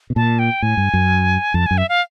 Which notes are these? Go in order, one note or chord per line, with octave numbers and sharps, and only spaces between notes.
B2
A#2 A5
G5
A2 G#5
G2
F#2
F2 A5
F#2 G#5
E5
F5